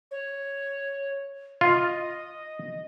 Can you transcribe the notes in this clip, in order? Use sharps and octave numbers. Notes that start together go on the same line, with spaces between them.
C#5
F4 D#5